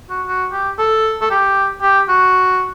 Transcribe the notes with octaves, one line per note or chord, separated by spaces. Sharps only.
F#4
F#4
G4
A4
A4
G4
G4
F#4